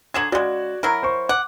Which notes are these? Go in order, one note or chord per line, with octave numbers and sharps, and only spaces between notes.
D3 F#3 G#4 G#6 E7 F#7
C#3 G#3 F#4 D5
F#3 E4 A#4 B5
C5 C#6
F#5 D6